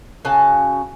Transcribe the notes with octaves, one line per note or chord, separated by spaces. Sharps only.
C#3 F#4 G#5 A5